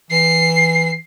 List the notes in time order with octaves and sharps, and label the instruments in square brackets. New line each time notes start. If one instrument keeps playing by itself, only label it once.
[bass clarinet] E3 [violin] C7